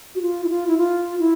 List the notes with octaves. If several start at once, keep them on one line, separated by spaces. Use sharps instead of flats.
F#4
F4
E4
F4
E4
F4
E4